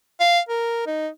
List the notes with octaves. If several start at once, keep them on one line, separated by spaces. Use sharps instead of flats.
F5
A#4
D#4